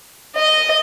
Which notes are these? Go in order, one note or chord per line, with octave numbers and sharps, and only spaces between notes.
D#5